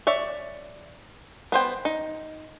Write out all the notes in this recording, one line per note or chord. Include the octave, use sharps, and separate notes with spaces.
C#5 D5 E5
B3 C5 G5
D#4